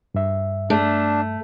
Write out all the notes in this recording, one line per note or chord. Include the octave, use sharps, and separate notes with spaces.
G2 E5
A3 D4